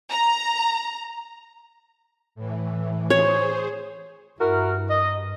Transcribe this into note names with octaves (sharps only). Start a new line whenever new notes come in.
A#5
A2 E3
G#4 C5 C#5
G2 E4 F#4 A#4
D#5